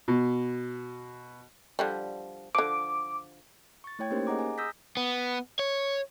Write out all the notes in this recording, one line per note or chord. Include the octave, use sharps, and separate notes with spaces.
B2
D3 F3 G3
D3 F3 D6
C#6 A6
A3 E4 C#5 G5 G#6
A#3 C#4 D#4 G4 A#4 C5
G#4 D#5 F#5 A#5 D6
G#5 A#5
D#6 E6 G6 A#6 B6
B3
C#5